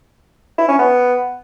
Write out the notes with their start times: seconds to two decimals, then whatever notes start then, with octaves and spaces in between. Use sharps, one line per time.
0.58 E4
0.68 C#4
0.78 B3